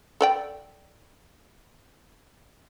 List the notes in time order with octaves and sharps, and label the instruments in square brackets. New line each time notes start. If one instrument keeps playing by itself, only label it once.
[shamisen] A4 D5 G5